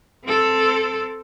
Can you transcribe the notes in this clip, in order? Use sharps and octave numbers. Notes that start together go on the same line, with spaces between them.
C4 A4